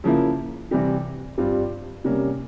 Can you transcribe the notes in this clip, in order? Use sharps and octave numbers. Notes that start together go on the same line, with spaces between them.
C#3 F3 A#3 E4
C3 E3 G3 C4 G4
G2 G3 C4 F4
C3 G3 A#3 C#4